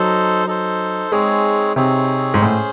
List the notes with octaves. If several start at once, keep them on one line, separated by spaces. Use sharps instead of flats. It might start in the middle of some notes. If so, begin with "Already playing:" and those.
Already playing: F#3 D#4 A4 C5
D#4 A4 C5
G#3 C4 D#4 G#4 C#5
C3 C4 D#4 G#4 C#5
G#2
A2 C#4 G#4 C5